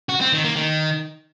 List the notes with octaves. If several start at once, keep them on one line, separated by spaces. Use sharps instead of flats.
F#4
C4
D#3
A#3
D#3